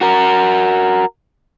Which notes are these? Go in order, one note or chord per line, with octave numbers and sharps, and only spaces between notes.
F#4 A#4